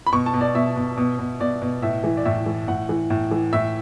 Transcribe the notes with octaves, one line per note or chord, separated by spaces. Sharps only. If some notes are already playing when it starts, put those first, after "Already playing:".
B5
B2 C#6
A5
B2
D5
B2 E5
B2
B2
B2
B2 D5
B2
A2 E5
E3
D5
A2 E5
E3
A2 F#5
E3
A2
E3
A2 E5